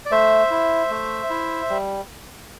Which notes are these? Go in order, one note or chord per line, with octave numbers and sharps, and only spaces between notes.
D5
A3 C5 E5
E4
A3
E4
G3